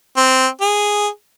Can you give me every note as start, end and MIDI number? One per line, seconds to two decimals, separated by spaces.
0.17 0.47 60
0.61 1.08 68